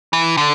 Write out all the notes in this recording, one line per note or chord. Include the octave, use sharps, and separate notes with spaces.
E3
D3